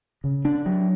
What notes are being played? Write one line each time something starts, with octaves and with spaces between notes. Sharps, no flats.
C#3
D4
F#3